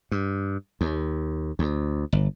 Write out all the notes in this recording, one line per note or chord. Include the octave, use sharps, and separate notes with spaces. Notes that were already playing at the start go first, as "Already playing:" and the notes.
G2
D#2
D2
G1